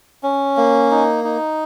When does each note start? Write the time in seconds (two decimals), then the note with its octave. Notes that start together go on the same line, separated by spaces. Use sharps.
0.23 C#4
0.57 A#3
0.91 D#4
1.24 D#4